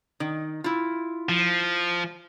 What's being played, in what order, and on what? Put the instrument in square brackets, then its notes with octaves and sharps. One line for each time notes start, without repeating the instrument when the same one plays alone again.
[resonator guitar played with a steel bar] D#3
E4 F4
[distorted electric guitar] F3